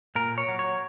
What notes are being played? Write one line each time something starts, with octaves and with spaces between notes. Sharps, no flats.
A#2 A#4
C#5
F#3
C#5